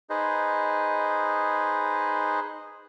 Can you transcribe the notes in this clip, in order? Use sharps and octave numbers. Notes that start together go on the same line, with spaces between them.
D#4 G#4 B4 C5 D#5